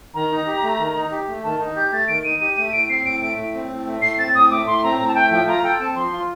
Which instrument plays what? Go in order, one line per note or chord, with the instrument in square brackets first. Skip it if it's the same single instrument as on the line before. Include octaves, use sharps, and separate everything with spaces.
[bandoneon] D#3 [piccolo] A#5
[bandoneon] D#4
G4
A3
D#3
D#4
G4
A3
[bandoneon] D#3 [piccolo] A5
[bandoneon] D#4
[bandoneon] G4 [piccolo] G6
[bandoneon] A3 [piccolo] A6
[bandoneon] D#3 [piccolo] D7
[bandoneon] D#4 [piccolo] D#7
[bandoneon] G4 [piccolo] D#7
[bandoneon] A3 [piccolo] D#7
[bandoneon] A2 [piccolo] D7
[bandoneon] C4 [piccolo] C7
[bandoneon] A2 [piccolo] D7
[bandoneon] A3 [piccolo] D7
[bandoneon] A2
C4
A2
A3
[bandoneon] A2 [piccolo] C7
[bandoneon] C4 [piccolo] A6
[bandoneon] A2 [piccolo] D#6
[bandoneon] A3 [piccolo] D6
[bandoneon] A2 [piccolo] C6
[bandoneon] C4 [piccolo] A#5
[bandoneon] A2 [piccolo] A#5
[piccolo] A5
[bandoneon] A3 [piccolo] G5
[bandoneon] F3 [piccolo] G5
[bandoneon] F4 [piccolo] A#5
[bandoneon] A4 [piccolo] G5
[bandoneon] C4 [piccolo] A5
[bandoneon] F3 [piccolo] C6
[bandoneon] F4